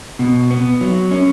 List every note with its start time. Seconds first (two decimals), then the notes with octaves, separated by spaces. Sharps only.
0.19 B2
0.51 B3
0.81 F#3
1.11 C#4